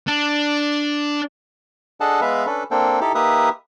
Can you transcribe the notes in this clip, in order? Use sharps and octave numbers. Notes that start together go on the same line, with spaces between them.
D4
D4 G#4 A4 D#5 F#5 A5
G#3 B3 B4 E5 F5
C#4 D4 A4 B4
A#3 C4 D4 A4 G5
D#4 E4 G4 A4
A#3 D#4 G4 B4 E5 D#6